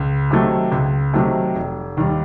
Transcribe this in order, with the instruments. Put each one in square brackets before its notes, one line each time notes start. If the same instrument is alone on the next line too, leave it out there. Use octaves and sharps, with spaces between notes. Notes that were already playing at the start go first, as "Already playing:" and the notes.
Already playing: [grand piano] C#2
C3 D#3 F#3 A3
C#2
C3 D#3 F#3 A3
F1
D#2 D#3 G3